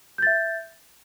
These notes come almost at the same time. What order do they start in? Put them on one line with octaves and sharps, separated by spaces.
G6 A6 E5